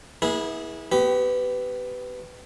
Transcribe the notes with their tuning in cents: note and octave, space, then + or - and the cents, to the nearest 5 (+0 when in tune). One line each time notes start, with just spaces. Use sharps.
B3 -40 E4 -25 G#4 +0
B3 +15 G4 -20